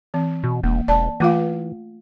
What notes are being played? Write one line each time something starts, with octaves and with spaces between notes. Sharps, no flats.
E3 C4
B2
E1 A#3
E1 D5 A5
E3 A3 F4 F5